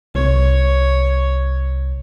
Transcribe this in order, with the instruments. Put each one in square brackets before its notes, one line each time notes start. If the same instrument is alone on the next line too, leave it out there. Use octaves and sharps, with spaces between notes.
[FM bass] C2 [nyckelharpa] C#5